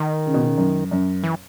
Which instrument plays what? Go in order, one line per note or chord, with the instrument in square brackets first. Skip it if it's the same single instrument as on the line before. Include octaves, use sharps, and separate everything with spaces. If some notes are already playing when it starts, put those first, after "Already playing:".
Already playing: [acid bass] D#3
[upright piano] C#3
B2
C#3
F#2
F#2
[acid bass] E3